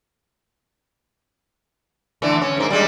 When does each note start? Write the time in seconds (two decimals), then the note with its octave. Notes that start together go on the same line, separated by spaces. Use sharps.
2.22 D3 E3 A3
2.41 C#4
2.57 G#2 A#3
2.70 G3 G#3